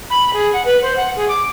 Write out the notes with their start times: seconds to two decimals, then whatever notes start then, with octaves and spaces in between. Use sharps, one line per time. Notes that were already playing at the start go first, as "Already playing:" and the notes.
0.10 B5
0.33 G#4
0.53 F#5
0.65 B4
0.82 C5
0.96 F#5
1.16 G#4
1.28 D6